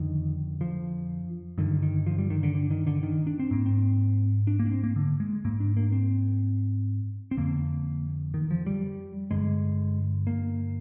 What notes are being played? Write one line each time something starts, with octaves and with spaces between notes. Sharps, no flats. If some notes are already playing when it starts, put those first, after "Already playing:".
Already playing: F2 D3 D#3
F3
G2 D3 D#3
D#3
F3
G3
D#3
D3
D3
D#3
D3
D#3
D4
C4
G#2 A#3
C4
D4
A#3
D4
C4
A#3
D3
G#3
G#2 A#3
D4
A#3
C4
C4
F2 D3 A#3
D#3
F3
G3
G2 D3 G#3
A#3